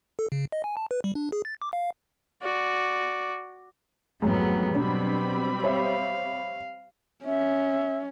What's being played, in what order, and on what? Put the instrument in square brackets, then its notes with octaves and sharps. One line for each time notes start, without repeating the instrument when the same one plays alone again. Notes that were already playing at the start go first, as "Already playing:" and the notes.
[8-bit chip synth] A4
C#3
D#5
G#5
A5
B4
G3
D4
G#4
A6
D6
F5
[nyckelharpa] F#4 D5
[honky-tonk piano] A1 F2 G#2 [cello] F#3 B3
[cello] B2 F#3 [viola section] G3 C4 B5 [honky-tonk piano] D4
[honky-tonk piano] C5 C#5 E5 [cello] F5
[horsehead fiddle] C#4 [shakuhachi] E5